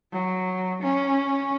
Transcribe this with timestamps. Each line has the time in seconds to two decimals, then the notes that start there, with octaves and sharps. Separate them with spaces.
0.12 F#3
0.82 C#4